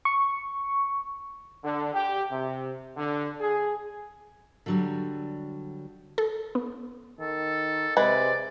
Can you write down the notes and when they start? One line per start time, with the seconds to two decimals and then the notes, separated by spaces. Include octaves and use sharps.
0.05 C#6
1.64 D3
1.94 G4
2.31 C3
2.97 D3
3.41 G#4
4.66 D3 F#3 G3
6.18 A4
6.55 B3
7.19 D#3 A4
7.97 C3 G#3 B4 D5